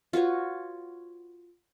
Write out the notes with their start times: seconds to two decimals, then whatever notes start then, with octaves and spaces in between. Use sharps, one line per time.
0.13 F4 F#4 B4 C#5